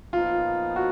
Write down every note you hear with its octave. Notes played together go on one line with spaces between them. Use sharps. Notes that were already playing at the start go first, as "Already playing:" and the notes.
A#2 F3 B3 D#4 F4
F#4